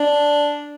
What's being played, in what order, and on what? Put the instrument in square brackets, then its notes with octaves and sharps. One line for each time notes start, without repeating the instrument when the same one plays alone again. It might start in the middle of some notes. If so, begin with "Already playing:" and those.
Already playing: [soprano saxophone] D4